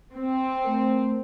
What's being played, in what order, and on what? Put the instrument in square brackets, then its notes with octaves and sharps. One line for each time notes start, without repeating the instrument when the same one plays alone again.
[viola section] C4
[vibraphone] A3 A#4